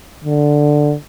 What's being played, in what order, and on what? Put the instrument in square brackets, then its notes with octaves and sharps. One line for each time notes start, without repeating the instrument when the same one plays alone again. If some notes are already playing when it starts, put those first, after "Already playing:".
[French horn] D3